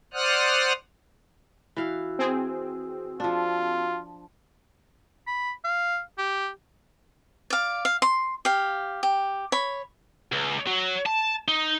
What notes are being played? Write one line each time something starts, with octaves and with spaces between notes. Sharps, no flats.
C5 D5 F#5 D#6 F6 F#6
E3 F#4 F5 E6
C4 G#4
F3 D4 F4
B5
F5
G4
D5 F5
F5
C6
G4 F5
G4
C#5 B5
C#2
F#3
A5
D#4